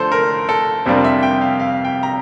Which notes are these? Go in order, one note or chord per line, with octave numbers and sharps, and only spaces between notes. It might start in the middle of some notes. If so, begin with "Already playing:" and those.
Already playing: D3 F3 A3 A4 C5
A#4
A4
F2 C3 G3 A#3 D4 C5
E5
G5
F5
F5
G5
A#5